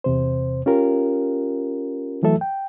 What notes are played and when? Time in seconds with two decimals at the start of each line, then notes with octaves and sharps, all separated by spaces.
0.04 E2 C3 C5
0.66 C#4 F4 G4 A#4
2.23 E3 F#3 A3 A4 E5
2.41 G5